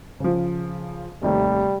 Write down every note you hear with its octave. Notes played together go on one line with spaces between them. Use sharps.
C#3 F3
D#2 C3 G3 A3